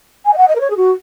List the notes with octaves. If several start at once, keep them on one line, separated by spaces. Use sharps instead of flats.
G#5
D#5
F#5
D#5
A#4
C#5
G#4
F#4